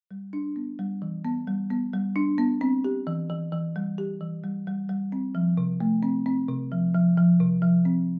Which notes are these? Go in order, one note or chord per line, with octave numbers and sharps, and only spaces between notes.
G3
D4
B3
G3
E3
B3
G3
B3
G3
D4
B3
C4
G4
E3
E3
E3
G3
G4
E3
G3
G3
G3
C4
F3
C3
A3
C4
C4
C3
F3
F3
F3
C3
F3
C4